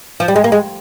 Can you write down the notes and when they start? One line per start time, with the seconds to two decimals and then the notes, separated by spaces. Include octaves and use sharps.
0.20 F3
0.28 G3
0.36 G#3
0.44 A#3
0.52 G#3